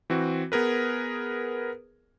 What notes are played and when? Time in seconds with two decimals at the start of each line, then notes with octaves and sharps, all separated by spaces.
0.10 E3 C4 F#4
0.52 B3 G#4 A#4 B4